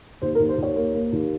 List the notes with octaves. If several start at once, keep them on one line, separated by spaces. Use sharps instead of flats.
D#2 C5
A#4
D#2
C5
D#2 C#5
A#3
A#3
D#2